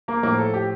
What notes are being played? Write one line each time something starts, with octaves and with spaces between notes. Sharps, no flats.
A#3 A#4
A2 F3 A#3 A#4
A4
G4